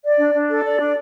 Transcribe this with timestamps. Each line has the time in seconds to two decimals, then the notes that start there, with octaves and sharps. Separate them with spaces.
0.04 D5
0.19 D4
0.34 D4
0.50 A4
0.64 D5
0.80 D4